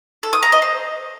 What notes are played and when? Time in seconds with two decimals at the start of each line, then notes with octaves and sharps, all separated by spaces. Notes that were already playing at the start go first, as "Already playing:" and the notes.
0.23 A4
0.33 D#6
0.43 A#5
0.52 D#5
0.62 C5